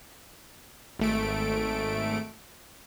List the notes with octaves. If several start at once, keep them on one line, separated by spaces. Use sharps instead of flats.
G#1 A3 D7